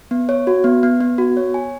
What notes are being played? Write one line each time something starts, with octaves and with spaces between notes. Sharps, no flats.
B3
C#5
F#4
B3
B3
B3
F#4
C#5
G#5